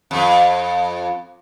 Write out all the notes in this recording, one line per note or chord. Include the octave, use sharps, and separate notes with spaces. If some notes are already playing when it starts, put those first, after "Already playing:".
F2